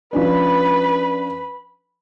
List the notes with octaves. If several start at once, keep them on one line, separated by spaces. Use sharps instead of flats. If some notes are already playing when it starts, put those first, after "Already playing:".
F3 C#4 D4 B4 B5